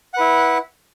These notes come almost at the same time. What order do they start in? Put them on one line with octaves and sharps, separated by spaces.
F#5 B4 E4